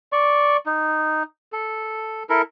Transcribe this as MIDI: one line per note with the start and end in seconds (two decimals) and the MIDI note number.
0.13 0.57 74
0.13 0.57 85
0.66 1.23 63
1.52 2.23 69
2.30 2.42 64
2.30 2.42 69
2.30 2.42 70